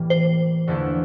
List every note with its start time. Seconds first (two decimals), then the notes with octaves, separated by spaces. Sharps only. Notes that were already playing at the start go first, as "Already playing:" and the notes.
Already playing: A2 E3 G3 A#3
0.10 C5
0.67 E2 D3 F3 A3 E4